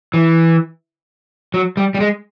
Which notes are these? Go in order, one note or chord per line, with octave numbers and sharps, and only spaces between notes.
E3
F#3
G3
G3
G#3